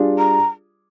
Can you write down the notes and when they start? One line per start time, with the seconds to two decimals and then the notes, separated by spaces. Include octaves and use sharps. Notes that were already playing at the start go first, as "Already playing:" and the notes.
Already playing: G3 D4 F4 G#4 D5
0.18 A#5